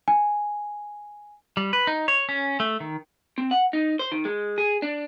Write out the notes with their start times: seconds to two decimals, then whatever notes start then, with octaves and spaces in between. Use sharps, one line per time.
0.08 G#5
1.57 G3
1.73 B4
1.87 D#4
2.08 C#5
2.29 C#4
2.60 A3
2.80 D#3
3.38 C4
3.51 F#5
3.73 D#4
3.99 C5
4.12 D#3
4.25 G#3
4.58 G#4
4.82 D4